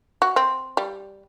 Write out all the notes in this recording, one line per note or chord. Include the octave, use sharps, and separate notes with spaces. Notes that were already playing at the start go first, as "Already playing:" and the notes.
F#4
C4
G3